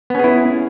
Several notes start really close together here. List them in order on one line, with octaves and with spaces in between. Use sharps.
B3 C#4 G#4 E4